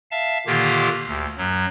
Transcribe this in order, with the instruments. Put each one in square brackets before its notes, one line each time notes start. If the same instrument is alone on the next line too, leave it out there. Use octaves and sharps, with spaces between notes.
[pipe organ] E5 F5 A5
A#2 D3 D#3 A#3 F4 G4
D2
F#2 F#3